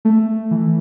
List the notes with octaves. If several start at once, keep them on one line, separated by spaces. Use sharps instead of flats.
A3
E3